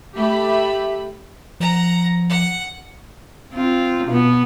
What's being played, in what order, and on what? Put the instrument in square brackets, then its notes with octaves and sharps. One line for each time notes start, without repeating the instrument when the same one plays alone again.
[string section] A3 G4 E5 B5
[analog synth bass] F3 [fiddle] F#5 A#5
[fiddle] F#5
[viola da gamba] C4 F4
B2 B3